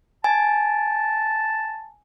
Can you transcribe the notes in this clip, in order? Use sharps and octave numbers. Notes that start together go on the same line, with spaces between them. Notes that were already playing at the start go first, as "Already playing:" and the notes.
G#5 A5